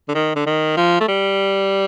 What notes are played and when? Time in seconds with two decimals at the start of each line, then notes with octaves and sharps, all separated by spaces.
0.08 D3
0.15 D#3
0.36 D3
0.46 D#3
0.77 F3
1.01 A3
1.08 G3